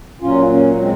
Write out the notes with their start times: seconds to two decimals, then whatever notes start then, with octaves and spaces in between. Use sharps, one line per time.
0.21 A#2 F#3 C#4 F4
0.50 A#3 C#4
0.79 G#3 C4